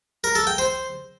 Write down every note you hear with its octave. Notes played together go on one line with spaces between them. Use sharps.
A#4
A4
G5
C5